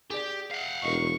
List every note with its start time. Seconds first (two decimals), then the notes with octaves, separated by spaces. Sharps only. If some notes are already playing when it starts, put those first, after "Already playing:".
0.10 G4 G#4 D5
0.51 F5 F#5
0.83 E1 A#4 D#5 C#6